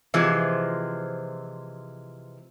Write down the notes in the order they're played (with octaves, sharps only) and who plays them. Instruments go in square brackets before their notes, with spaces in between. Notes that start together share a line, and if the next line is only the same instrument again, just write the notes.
[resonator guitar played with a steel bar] C3 E3 F3 G#3